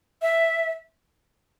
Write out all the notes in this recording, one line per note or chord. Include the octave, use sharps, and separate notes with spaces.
E5